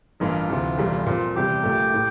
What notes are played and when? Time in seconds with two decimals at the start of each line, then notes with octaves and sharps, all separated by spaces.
0.20 A1 G2 E3 A#3 F4
0.49 D2 C3 E3
0.77 F1 E2 E3 G3
1.06 A#2 F3 C4
1.35 E2 C3 G3 G4
1.63 A#1 A#2 A3
1.94 A2